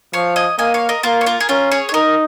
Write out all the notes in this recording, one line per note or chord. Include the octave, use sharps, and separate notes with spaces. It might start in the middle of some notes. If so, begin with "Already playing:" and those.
F3 C#5 F5
D#5 G#5
A#3 D#5 G#5
C#5 F5
A#4 D#5
A#3 F4 A#4
C#5
F4 A#4
G#4
C#4 F4 A#4
G#4 C#5
C#5
D#4 A#4 D#5